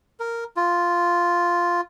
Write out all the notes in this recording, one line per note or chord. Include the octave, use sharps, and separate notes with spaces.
A#4
F4